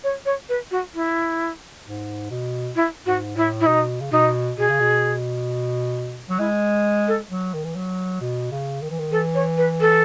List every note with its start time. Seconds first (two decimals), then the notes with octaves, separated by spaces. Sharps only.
0.04 C#5
0.26 C#5
0.49 B4
0.71 F#4
0.94 E4
1.85 G#2
2.30 B2
2.76 E4
3.06 G#2 F#4
3.36 A2 E4
3.61 E4
3.66 B2 D#4
4.01 C#3
4.12 B2 D#4
4.58 B2 G#4
4.69 C#3
4.80 B2
6.30 F#3
6.39 G#3 E4
7.08 A4
7.30 F#3
7.54 D#3
7.64 E3
7.76 F#3
8.21 B2
8.51 C#3
8.82 D#3
8.91 E3
8.99 D#3
9.12 E3 A4
9.35 C#5
9.57 B4
9.81 A4